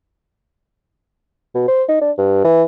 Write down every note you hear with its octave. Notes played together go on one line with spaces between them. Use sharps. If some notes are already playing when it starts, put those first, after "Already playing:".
B2
C5
D#4
D4
G2
E3